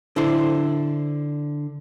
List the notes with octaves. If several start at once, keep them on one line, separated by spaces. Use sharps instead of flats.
D3 E4 C5